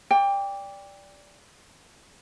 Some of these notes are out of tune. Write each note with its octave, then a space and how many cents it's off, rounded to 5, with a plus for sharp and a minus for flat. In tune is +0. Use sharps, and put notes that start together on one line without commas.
D5 -15 G5 +25